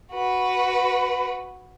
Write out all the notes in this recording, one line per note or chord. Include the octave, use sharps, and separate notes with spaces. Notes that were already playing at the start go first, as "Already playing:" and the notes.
F#4 B4